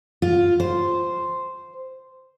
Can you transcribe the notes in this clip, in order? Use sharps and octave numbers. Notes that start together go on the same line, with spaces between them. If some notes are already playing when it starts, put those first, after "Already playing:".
F4
C5